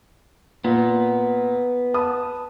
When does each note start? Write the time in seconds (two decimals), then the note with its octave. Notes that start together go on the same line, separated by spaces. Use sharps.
0.64 A#2 B3
1.94 B4 A5 D#6